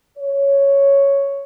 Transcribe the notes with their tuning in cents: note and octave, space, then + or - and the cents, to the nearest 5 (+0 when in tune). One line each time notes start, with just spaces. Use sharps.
C#5 +0